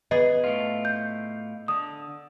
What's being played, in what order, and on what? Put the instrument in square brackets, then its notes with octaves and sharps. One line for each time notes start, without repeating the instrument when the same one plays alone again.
[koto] B3 G#4 [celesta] D#5
[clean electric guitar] A2 F4
[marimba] G6
[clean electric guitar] D3 [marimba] D#6